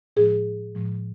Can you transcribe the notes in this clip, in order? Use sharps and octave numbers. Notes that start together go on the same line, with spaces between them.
A2 F3 G#3 G#4
A2 F3 G#3